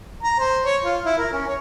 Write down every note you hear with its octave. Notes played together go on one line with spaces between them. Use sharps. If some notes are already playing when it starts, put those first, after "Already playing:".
A#5
C5
C#5
F4
E4
A#4
C#4
C#5